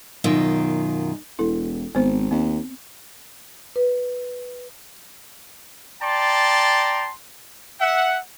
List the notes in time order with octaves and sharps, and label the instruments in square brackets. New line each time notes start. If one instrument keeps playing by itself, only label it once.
[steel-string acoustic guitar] F#2 B2 D#3 F4
[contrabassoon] E1 [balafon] E4 A4
[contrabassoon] G#1 [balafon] B3 C5
[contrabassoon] D#2 [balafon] C4
[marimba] B4
[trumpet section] D5 G5 A5 A#5 C6
E5 F#5